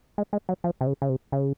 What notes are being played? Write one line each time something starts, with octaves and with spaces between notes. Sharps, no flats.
G#3
G#3
F#3
F3
C3
C#3
C#3
C3
C#3